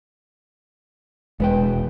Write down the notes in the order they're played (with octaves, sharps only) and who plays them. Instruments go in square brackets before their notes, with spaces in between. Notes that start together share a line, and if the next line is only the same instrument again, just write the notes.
[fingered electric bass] E1 [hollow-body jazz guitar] G#3 B4 G5